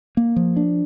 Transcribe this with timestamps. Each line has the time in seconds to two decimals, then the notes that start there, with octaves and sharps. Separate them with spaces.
0.17 A#3
0.36 F3
0.56 D4